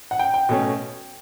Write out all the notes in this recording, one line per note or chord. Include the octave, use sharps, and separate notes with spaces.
F#5
G5
G5
B2 A3 C#4